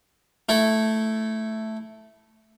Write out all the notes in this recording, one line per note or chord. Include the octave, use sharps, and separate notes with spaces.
A3 E4 A4